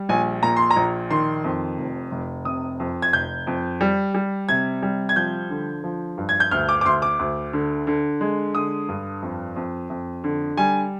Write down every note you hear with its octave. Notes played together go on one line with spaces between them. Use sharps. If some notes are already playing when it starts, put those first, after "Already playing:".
Already playing: G3
A#1 G#5
A#2 A#5
C6
A#5
A#1
D#3 C6
F2
F1
F1
C3 D#6
F2
G#6
F1 G6
F2
G3
G3
C3 G#6
G3
G#6
F3 G6
D3
F3
G2
G#6
G6
D2 F6
D6
D6
D2 C6
D6
D2
D3
D3
G#3
D3 D#6
G2
F2
F2
F2
D3
G3 G#5